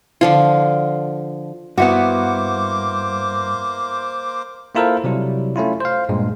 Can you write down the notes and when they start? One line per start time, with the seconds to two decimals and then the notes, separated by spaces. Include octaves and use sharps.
0.21 D3 F3 F4
1.78 G2 A#3 B3 E4 F#4 C5 D6
4.75 A#3 E4 F4 A4 A#4 C5
5.04 C3 F#3 G3 E4
5.56 A3 C#4 E4 F4
5.81 C5 F5
6.09 G2 A#2 G#3